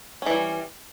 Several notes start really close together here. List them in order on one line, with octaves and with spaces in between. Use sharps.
C#4 E3 G3